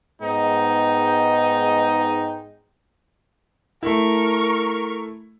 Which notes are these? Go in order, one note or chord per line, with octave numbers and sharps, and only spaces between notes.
G#2 G#3 B3 D#4 G5
A3 E4 A#4 C#6